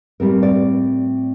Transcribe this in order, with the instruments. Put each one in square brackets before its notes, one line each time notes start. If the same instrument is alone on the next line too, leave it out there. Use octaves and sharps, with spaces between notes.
[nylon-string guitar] A2 G3 C4 A#4
D5